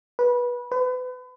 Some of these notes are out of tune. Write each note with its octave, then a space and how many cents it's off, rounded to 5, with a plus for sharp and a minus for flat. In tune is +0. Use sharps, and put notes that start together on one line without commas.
B4 -20
B4 +35